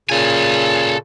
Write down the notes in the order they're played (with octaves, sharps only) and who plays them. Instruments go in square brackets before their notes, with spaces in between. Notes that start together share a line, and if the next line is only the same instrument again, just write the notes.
[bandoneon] A#2 C#3 [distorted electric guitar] A4 G#5